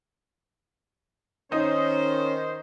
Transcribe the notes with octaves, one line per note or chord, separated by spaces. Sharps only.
D#3 C#4 D#4 C5